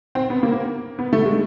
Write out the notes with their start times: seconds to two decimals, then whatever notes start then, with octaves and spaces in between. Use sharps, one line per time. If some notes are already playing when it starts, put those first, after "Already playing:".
0.15 C4
0.30 B3
0.43 A#3
0.99 B3
1.13 A3
1.26 G#3